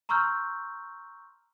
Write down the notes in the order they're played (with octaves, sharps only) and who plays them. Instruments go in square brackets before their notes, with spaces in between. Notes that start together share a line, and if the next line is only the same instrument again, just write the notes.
[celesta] A#5 C6 C#6 E6 F6 G6